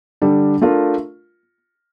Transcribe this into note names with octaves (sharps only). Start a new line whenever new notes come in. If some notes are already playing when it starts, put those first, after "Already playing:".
D3 G3 D4 A4
A3 D4 F4 A#4